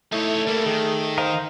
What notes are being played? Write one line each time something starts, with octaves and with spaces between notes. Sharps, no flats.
A3 D#4 E4 C#5
G3 A#3 E4
D#3 G#4
A#4 C5 D#5 F5